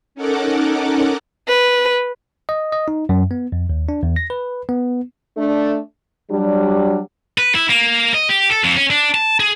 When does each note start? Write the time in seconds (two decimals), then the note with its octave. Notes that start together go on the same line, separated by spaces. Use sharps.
0.15 C#4 D#4 A4 A#4 F#5 D6
1.48 B4
2.49 D#5
2.72 D#5
2.88 D#4
3.09 F#2
3.31 B3
3.52 F2
3.69 D#2
3.89 D4
4.03 E2
4.16 A#6
4.30 B4
4.69 B3
5.37 A3 D4
6.31 F#3 G3 D4
7.38 B4
7.55 E4
7.70 A#3
8.14 D#5
8.29 G4
8.50 A4
8.64 F2
8.76 C#4
8.90 D4
9.14 A5
9.40 G#4